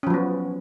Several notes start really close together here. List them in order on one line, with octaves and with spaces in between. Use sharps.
C#4 F3 F#3 B3